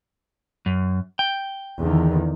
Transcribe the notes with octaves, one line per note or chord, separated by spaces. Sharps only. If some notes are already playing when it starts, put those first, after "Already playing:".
F#2
G5
E2 D3 D#3